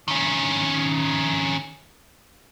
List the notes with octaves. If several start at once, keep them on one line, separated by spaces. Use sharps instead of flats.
D#3 C#4